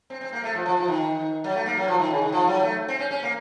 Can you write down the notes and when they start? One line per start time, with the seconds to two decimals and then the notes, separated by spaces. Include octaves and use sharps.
0.10 C4
0.21 C4
0.33 A#3
0.44 A3
0.55 F3
0.66 F3
0.77 F3
0.88 D#3
1.44 F#3
1.55 A3
1.66 A#3
1.77 F#3
1.88 F3
1.99 D#3
2.10 C#3
2.21 D#3
2.32 F3
2.47 F#3
2.63 A3
2.88 C4
3.00 C#4
3.11 C#4
3.22 A#3